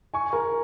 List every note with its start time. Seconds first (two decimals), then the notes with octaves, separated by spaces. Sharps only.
0.14 G#5 C#6
0.33 A#4